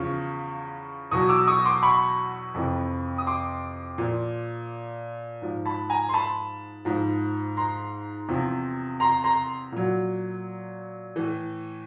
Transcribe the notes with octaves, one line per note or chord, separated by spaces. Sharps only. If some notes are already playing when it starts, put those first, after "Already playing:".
Already playing: E2 C#3 F3 C#6
E2 B2 F#3 C#6 D#6
D6 E6
C#6 D#6
C6 D6
B5 C#6
F2 C3 E3
D#6
C6 D6
A#2 F3
G#2 F3
A5 B5
G#5 A#5
C6
A5 B5
G#2 F3
A#5 C6
E2 C3 F3
A#5 C6
A#5 C6
A#2 F#3
A2 E3